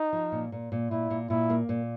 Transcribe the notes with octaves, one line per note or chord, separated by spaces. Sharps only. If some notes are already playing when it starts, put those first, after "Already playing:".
Already playing: D#4
F3
A#2
A#2
A#2
A#2 E4
A#2
A#2 E4
A#3
A#2